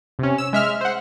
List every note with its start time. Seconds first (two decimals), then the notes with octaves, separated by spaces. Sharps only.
0.19 C3 C#4
0.38 E6
0.53 G#3 E5 F6
0.81 C5 F#5